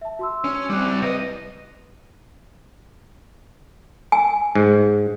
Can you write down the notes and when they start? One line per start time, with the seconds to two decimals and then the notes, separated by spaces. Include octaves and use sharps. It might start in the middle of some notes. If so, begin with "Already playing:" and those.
0.01 E5 A5
0.19 F#4 C6 E6
0.45 C#4
0.70 G3 C4 D6 F#6
1.02 C2 B4 D#5 A#6
4.12 G#5
4.55 G#2